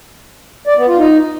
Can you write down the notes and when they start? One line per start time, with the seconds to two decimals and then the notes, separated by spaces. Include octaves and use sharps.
0.67 D5
0.77 B3
0.88 F4
0.98 D#4